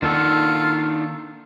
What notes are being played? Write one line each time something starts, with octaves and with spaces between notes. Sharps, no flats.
D#3 A#3 D4 D#4 F4 A4 F#5